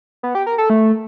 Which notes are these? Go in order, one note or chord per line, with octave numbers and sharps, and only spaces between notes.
B3
G4
A#4
A4
A3